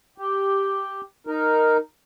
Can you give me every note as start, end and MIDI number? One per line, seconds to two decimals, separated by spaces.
0.18 1.01 67
1.27 1.77 63
1.27 1.77 70